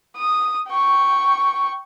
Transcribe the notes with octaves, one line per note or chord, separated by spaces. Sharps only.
D#6
G5 C#6